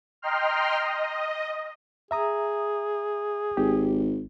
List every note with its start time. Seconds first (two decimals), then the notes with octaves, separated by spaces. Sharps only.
0.22 D#5 G5 A#5 C6 F6
0.83 D#5
2.11 G#4 E5 A#5 D#6
3.57 G#1 G4